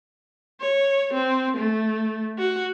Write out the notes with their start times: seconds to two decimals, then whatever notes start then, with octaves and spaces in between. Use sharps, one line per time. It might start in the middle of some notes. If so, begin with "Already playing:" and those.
0.60 C#5
1.13 C4
1.57 A3
2.39 F#4